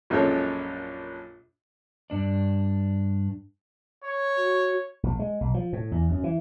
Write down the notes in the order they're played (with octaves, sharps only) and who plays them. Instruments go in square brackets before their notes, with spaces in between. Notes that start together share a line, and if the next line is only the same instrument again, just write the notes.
[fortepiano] A#1 F#2 G#3 F4 A4 C#5
[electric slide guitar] G2 D4 D5
[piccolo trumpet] C#5
[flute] F#4
[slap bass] A#1
G#3
B1
F3
A2
E2
F#2
E3